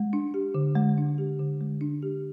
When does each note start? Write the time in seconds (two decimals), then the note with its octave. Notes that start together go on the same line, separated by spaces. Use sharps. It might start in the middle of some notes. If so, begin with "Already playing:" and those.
Already playing: G#3
0.13 D4
0.34 G4
0.55 D3
0.76 G#3
0.98 D4
1.18 G4
1.39 D3
1.61 G#3
1.81 D4
2.03 G4